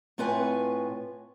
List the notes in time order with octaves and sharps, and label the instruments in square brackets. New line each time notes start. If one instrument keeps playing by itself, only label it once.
[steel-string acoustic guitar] A2 C4 F4 B4 C#5 G#5